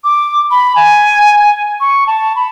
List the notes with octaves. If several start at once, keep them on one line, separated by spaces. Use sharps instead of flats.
D6
B5
G#5
C#6
A5
B5